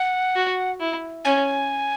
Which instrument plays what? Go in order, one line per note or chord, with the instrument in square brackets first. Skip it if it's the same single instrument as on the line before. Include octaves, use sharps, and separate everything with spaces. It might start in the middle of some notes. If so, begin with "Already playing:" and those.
Already playing: [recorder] F#5
[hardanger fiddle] F#4
E4
[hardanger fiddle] C#4 [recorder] G#5